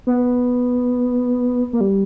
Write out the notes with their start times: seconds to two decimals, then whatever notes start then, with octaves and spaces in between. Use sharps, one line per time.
0.07 B3
1.73 A#3
1.81 G3